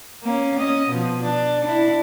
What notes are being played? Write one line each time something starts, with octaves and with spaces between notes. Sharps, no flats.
A#3 C#4
C#4 D#5
B2 F3
D4
D4 E4